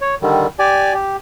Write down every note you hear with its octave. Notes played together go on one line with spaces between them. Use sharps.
C#5
D3 D#3 G3
G4 D5 G#5
G4